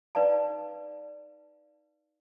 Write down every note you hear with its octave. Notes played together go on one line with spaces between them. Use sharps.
D#4 B4 D5 F5 A5